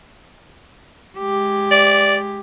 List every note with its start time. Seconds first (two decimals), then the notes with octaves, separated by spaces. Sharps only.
1.18 G#3 G4
1.71 D5